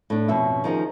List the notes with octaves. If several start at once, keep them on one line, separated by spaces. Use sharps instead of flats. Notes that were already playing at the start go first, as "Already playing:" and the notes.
A2 D4
F2 B2 C#4 E5
D#3 F3 D#4 G#4